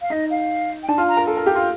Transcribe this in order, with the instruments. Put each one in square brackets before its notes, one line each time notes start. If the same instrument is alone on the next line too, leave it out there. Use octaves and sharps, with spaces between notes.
[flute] F5
[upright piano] D#4 [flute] D#5
[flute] F5
G5
[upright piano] D4 [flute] A5
[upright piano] F4
[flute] A#5
[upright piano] A#4
A4
A#4
G4
F4